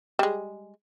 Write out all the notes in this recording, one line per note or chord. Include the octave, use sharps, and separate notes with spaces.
G3 G#3